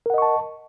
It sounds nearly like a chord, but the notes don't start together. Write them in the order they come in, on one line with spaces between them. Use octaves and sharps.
A#4 F#5 D#5 C#6 A5